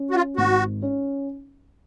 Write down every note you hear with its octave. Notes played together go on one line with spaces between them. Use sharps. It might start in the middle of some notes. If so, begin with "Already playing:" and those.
Already playing: C#4
F#4
F4
G#1 F#4
C#4